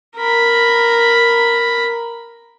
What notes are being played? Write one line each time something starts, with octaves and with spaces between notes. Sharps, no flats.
A#4 B5